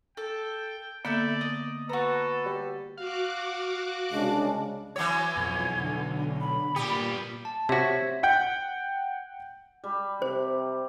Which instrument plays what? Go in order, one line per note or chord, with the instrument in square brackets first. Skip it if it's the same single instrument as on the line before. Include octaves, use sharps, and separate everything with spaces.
[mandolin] A4 [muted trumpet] G5
[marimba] D3 A#3 B3 [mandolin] A4 E5 G6 [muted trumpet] D5
[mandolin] D#5
[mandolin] F#4 A#5 [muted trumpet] A4 [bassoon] B4
[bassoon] G3
[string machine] F#4 F#5 D6 [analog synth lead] F5
[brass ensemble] C2 C#3 G#3 [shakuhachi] D4
[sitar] E3 F#3 C#5 [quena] G#6
[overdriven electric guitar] B1 [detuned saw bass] F2
[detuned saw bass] D3
[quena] B5
[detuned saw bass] A#2 [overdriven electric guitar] G3 B3 [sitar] G4
[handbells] A5
[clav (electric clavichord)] C3 F#4 [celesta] G4 C5 C#5 [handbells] E5 [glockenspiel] G#6 B6
[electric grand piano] F#5 G5 G6
[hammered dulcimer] G3
[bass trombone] C3 [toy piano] C5